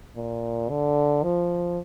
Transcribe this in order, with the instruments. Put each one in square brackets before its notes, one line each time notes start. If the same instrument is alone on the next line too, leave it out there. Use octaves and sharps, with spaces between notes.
[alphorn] A#2
D3
F3